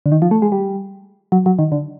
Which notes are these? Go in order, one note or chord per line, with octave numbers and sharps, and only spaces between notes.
D3
D#3
F3
A3
G#3
G3
F#3
F#3
D#3
D3